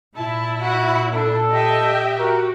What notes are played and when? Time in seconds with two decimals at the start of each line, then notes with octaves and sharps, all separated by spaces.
0.17 A#2 E4 A5
0.62 F#4
1.14 D4 A4
1.51 G4 D#5 E5 G5
2.19 F#4 A#4